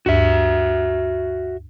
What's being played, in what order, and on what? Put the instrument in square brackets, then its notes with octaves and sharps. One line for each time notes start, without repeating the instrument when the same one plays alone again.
[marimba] D2 G2 [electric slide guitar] F#4 E5